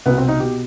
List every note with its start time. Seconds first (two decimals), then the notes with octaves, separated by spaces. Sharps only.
0.06 C2 B2 B3
0.18 C4
0.28 D#4
0.40 B2 G4